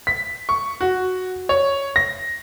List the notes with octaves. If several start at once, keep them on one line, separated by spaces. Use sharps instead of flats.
B6
C#6
F#4
C#5
A#6